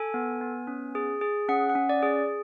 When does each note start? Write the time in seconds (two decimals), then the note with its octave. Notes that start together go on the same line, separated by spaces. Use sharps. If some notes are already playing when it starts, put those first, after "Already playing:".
Already playing: A4 G#5
0.14 B3
0.41 B3
0.67 C#4
0.95 G#4
1.21 G#4
1.49 C#4 F#5
1.70 F#5
1.75 C#4
1.89 D5
2.02 G#4